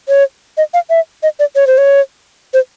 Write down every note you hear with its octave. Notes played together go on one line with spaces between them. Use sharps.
C#5
D#5
F5
E5
D#5
D5
C#5
C5
C#5
C5